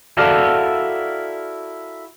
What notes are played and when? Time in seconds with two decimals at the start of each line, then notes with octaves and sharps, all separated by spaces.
0.17 E4 F#4 A4 A#4 D5 F5